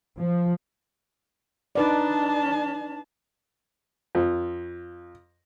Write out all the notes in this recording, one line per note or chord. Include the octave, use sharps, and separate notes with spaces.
F3
D4 D#4 B4 D5 A5
F2